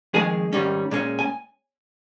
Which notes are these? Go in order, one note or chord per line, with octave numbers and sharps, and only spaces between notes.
F2 D#3 G#3 G#4 G#5
G#2 D#3 G3 C#4
A#2 G#3 C#4
G#5